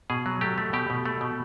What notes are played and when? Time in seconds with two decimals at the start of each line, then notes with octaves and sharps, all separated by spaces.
0.10 B2 G#4
0.26 F#3
0.41 A3 G4
0.58 A3
0.73 B2 G4
0.90 B2
1.06 A3
1.21 B2